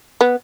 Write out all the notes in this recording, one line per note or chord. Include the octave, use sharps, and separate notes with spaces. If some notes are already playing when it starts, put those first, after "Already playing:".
B3